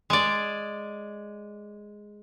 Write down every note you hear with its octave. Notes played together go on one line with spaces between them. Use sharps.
G#3 D5